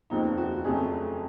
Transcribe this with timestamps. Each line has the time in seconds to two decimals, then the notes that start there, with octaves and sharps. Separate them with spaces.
0.10 F1 D#2 C#3 F3 A#3 D#4
0.37 F#4
0.64 F1 F2 C#3 F#3 A3 G#4